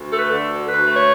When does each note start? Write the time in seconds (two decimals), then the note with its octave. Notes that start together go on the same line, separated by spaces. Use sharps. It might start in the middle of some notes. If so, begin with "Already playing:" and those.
Already playing: D2
0.10 A3 A4
0.19 B4
0.28 D3 A4
0.48 D2
0.67 D2 B4
0.86 A3
0.95 C#5